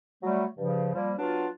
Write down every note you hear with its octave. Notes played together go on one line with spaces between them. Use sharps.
F#3 G3 A3
G2 C#3 F3
F3 G3 A#3
F#3 B3 D4 F4